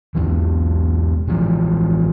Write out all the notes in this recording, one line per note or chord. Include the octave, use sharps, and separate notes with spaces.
E2 G#2 E3
A1 E3 F3 G#3